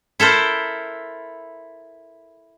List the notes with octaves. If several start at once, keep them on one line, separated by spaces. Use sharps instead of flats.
E4 A4 A#4 C5